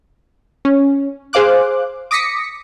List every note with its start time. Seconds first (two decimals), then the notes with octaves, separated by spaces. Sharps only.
0.65 C#4
1.33 G#4 C5 F5 D6 F#6
2.11 D6 D#6 A#6 B6 C#7